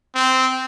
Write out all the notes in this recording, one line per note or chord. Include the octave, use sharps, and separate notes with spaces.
C4